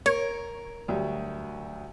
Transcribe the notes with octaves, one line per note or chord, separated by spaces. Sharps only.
A#4 C#5
D2 F#3 G3